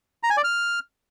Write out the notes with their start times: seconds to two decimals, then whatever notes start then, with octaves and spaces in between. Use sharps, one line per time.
0.23 A#5
0.30 G#5
0.37 D5
0.44 F6